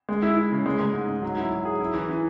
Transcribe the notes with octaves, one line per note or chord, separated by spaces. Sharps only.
G#3
E4
E4
C#3
G#3
G#3
G#2
G#2
F#3
E4
F#3
G#4
E4
E3
E3